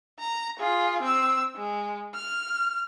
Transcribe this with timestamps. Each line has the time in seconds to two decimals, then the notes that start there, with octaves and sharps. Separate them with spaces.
0.19 A#5
0.59 F4 G#4
1.02 C4 E6
1.56 G#3
2.15 F6